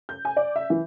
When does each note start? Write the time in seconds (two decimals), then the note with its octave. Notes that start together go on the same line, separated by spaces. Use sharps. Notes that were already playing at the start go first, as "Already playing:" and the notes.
0.09 G6
0.25 G#5
0.37 D5
0.56 E5
0.70 E3